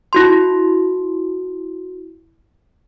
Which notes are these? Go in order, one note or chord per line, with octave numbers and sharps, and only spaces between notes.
E4 F#4 C6